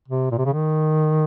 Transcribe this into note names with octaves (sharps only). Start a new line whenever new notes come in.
C3
A#2
C3
C#3
D#3